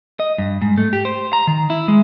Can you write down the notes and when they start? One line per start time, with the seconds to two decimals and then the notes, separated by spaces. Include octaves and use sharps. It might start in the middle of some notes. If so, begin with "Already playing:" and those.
0.20 D#5
0.38 G2
0.62 G#2
0.78 A3
0.93 G4
1.05 C5
1.33 A#5
1.47 D#3
1.70 E4
1.88 G#3